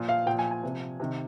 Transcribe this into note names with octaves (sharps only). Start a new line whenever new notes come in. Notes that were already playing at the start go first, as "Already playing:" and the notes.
Already playing: A#2 F3
F5
A#2 F3 G5
G#5
G#5
C3 F3
C3 D#3